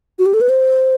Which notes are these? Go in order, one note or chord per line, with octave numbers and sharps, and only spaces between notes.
F#4
G4
A4
B4
C5